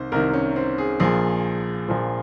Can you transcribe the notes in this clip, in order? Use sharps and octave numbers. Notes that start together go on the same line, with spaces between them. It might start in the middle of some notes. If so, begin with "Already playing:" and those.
Already playing: C2 C3 D#3 C5
C2 C3 D#3 A#4
C#4
C4
G#4
A#1 A#2 F3 G#4
A#1 A#2 F3